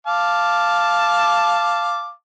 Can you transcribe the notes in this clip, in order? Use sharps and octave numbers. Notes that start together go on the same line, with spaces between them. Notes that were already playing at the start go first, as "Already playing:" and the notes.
F5 A5 D6